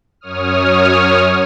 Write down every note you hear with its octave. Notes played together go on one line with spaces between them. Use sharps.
F#2 C#5 D#6 F6